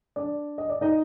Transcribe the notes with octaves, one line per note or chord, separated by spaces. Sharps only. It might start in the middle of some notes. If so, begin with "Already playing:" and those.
D4 D5
D#5
D5
D#4 D#5